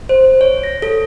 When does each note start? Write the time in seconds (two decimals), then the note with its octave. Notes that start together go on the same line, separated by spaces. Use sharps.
0.09 C5
0.41 C#5
0.63 A#6
0.82 A4